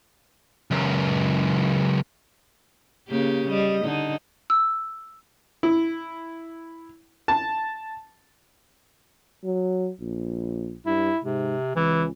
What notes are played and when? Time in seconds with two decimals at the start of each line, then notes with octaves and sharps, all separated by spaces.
0.71 C#2 F#2
3.09 C#3 A#3 G4
3.50 G3 D#5
3.85 D3 D#4
4.50 E6
5.63 E4
7.28 A5
9.44 F#3
10.01 A#1
10.86 G2 E4
11.24 G#2 C3
11.76 C#2 E3